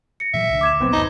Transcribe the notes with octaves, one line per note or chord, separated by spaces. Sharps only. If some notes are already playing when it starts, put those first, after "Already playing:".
A#6 C#7
A#2 E3 F#3 E5
C2 D3
D2 D6 G#6 E7
A#1 B2 F#3 B3 C4
F#1 D2 D#4